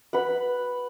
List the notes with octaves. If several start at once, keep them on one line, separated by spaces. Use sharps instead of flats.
B4 F#5